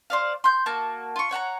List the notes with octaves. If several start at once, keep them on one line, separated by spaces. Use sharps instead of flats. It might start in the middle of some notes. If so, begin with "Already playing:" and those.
C5 D5 F5
C6 G6
A#3 F#4 A5
F4 C#6
C#5 F#5 A5 A#5